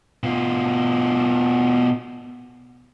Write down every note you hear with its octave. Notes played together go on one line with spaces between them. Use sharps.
B2 F4